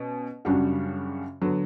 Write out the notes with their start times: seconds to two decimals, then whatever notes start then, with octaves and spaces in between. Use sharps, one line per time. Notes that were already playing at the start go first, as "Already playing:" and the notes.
Already playing: B2 C#4
0.45 F#2 C#3 G3 D4 F#4
1.42 D3 F#3 B3